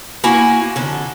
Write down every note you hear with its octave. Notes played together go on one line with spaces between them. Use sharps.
A#3 E4 F#4 G#5
F2 D3